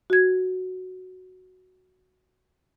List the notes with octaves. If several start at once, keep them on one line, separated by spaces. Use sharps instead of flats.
F#4 G#6